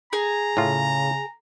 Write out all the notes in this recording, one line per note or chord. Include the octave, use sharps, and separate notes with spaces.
G#4 A#5
A2 C#3 F4